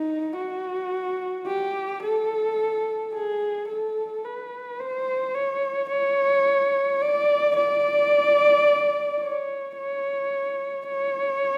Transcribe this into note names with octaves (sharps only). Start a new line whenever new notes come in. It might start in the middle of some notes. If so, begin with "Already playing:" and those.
Already playing: D#4
F#4
G4
A4
G#4
A4
B4
C5
C#5
C#5
D5
D5
C#5
C#5
C#5